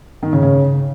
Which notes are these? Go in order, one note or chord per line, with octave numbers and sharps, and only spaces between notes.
D#3
C#3
C#3